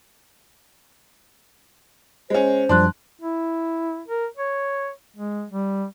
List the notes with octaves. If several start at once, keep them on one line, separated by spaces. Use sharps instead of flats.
G#3 C#4 C5
F#2 F3 G3 D4 A5 C6 F#6
E4
A#4
C#5
G#3
G3